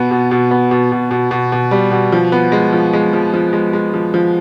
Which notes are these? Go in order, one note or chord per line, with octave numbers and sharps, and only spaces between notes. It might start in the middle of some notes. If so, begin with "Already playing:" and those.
Already playing: B2 B3
B2
B2
B3
B2
B2
B2
B2
B2
G3
B2
F3
B3
G#3
F3
G#3
F3
F3
G#3
G#3
F3
F3